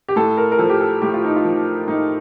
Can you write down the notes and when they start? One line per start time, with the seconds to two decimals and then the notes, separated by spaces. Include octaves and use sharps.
0.08 G4
0.16 A2 A4
0.37 A#4
0.52 A#4
0.59 F3 A4
0.69 G4
0.81 A4
1.02 A2 G4
1.14 F4
1.25 D#4
1.36 F4
1.45 F3
1.88 A2 D#4